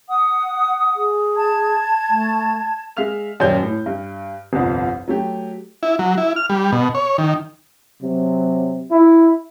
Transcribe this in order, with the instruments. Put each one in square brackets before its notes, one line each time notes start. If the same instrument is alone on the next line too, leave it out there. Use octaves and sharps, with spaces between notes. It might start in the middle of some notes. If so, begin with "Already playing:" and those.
[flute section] F#5 D#6
[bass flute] G#4
[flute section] A5 G#6
[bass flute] A3
[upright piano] G#3 E5 F5 F6 F7
D#1 F#2 C#4 G4 D5 G6
A2
G2
G1 C2 F2
F#3 A3 G4
[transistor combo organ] E4
F#3
E4
F6
G3
B2
C#5
D#3
[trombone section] C3 F#3
E4